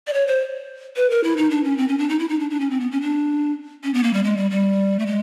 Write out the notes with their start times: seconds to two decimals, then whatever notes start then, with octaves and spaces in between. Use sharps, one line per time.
0.07 D5
0.14 C#5
0.27 C5
0.96 B4
1.10 A#4
1.24 E4
1.37 D#4
1.51 D4
1.64 C#4
1.78 C4
1.88 C#4
1.98 D4
2.09 D#4
2.19 E4
2.29 D#4
2.40 D4
2.50 D4
2.60 C#4
2.70 C4
2.80 B3
2.91 C#4
3.02 D4
3.84 C#4
3.94 B3
4.04 A#3
4.14 G3
4.24 G#3
4.37 G3
4.51 G3
4.99 A3
5.07 G#3